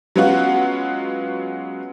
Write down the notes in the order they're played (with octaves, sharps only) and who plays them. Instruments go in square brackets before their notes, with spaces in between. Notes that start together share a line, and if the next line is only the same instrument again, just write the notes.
[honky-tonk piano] F#3 G#3 B3 C#4 F4 F#4